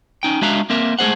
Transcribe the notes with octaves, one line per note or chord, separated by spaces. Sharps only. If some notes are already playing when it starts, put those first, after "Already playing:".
C#4 D#4 G5
G#3 D4 F#4 E5 F5 A#5
A#3 C4 A#4 E5
G#3 A3 G#4 C5 F#5